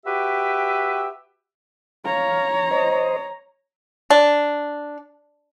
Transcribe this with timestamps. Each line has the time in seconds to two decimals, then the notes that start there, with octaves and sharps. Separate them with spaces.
0.06 F#4 G4 B4 E5 G5
2.05 C#5 F5 A#5
2.71 C5 D#5
4.10 D4